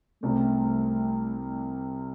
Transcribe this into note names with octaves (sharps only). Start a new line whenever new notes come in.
C2 C3 G3 A3 C4